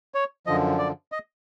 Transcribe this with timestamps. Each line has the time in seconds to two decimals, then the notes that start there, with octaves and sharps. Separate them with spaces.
0.14 C#5
0.47 F#2 D3 F3 D#5
0.78 D5
1.12 D#5